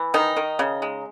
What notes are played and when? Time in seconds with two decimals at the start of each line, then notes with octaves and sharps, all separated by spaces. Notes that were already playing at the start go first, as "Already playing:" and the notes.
Already playing: E3
0.14 D#3 D#4
0.37 D#3
0.59 C#3
0.82 G#3